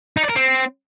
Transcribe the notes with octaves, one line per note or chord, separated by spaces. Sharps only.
D#4
D5
A#4
C4